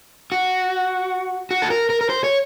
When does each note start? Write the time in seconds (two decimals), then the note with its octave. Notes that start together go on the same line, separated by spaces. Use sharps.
0.32 F#4
1.51 F#4
1.62 A4
1.70 A#4
1.90 A#4
2.01 A#4
2.10 C5
2.24 C#5